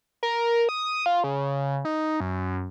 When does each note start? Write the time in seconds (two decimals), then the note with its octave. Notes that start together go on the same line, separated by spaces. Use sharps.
0.23 A#4
0.69 D#6
1.06 F4
1.24 C#3
1.85 D#4
2.20 F#2